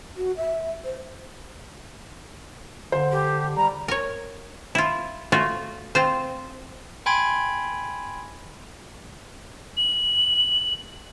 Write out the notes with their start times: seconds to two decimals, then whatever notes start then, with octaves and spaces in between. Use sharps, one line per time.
0.17 F#4
0.37 E5
0.84 C5
2.92 D3 C5
3.12 G4
3.57 G3 A#5
3.88 A#4 C#5
4.75 E4 F4
5.32 A3 F4 F#4
5.95 C4 F4 C5
7.06 G5 G#5 B5 C6 G#6 D7
9.77 F#7